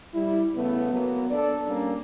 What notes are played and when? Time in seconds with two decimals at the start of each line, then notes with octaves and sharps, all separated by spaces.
0.14 G3 E4
0.56 C#3 A3 B3
0.92 F#3 A#3 B3
1.30 D4 A4 D5
1.68 G3 A#3 C#4 D4